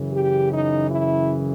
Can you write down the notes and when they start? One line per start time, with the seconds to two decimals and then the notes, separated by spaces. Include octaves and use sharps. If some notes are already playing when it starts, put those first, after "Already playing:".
Already playing: F#2 C#3 E3
0.10 G4
0.51 D#4
0.90 E4